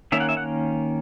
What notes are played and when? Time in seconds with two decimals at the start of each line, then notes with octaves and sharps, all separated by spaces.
0.12 D#3 A#3 C#4 E5
0.20 F#5
0.29 E5
0.37 F#5